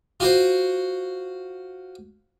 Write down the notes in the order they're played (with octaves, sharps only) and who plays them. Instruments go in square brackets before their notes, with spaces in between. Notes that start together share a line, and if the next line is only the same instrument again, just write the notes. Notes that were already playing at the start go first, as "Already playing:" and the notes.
[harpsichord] F4 F#4 C5